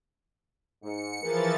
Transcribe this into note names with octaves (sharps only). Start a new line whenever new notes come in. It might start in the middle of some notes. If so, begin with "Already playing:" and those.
G#2 C#7
E3 F3 A#3 G#4 A#4 A6